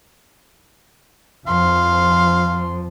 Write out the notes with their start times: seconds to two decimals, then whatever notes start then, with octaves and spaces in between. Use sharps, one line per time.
1.47 F2 F3 F5 C6